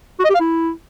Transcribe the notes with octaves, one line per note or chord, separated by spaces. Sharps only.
F#4
D#5
G4
F5
E4